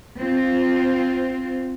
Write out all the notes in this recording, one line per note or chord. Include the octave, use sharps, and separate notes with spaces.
C4 F4